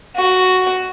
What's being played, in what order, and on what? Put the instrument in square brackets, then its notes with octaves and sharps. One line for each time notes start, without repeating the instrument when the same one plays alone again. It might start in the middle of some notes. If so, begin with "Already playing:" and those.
[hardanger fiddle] F#4